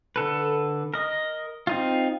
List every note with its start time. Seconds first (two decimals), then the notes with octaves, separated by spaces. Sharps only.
0.16 D3 A4 B4
0.94 A#4 D#5
1.67 C4 D#4 F4